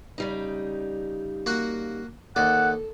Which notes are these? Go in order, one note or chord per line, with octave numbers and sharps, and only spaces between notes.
C#3 G3 D#4
A#3 F#4 F#5
D#2 A4 D5 F#5